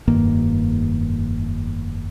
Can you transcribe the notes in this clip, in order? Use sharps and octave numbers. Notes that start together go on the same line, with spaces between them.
F1 G2 D#3 A#3